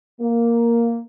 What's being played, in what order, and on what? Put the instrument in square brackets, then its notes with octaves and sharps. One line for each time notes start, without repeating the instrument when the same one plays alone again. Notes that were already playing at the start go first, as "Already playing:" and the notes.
[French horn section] A#3